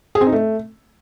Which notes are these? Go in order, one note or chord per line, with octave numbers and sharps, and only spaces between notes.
G#4
C4
D#4
A3